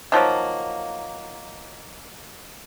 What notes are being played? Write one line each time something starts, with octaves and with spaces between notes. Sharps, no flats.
D#3 F3 F#3 A#3